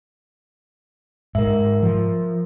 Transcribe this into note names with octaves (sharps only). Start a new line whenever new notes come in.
G#2 A#4 E5
F3